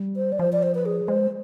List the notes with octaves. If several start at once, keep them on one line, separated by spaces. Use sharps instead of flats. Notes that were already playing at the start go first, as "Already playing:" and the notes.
Already playing: G3
C5
D5
F3 C5
D5
C5
B4
G#4
G#3 C5